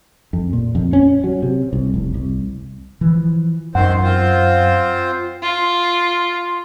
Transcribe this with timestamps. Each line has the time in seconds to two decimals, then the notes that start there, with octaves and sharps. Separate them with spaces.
0.33 F2
0.53 A#2
0.75 F2
0.93 C#4
1.24 F#3
1.42 C3
1.73 C2
1.94 F1
2.14 C2
3.01 E3 F3
3.75 F#2 D#3 C4 C5 F#5
4.03 C4 F4 C5
5.43 F4